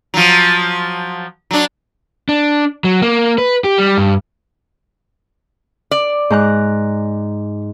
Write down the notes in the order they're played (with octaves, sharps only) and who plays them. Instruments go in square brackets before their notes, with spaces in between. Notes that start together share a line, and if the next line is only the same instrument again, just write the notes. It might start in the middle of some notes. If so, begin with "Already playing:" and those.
[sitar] F3 F#3
F#3 D4
[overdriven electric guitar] D4
F#3
A#3
B4
G4
G3
G2
[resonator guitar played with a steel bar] D5
[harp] G#2 A#5 F#6